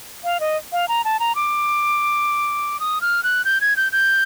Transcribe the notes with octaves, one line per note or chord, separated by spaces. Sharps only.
F5
D#5
F5
A#5
A5
A#5
D6
D#6
F6
F#6
G6
G#6
G6
G6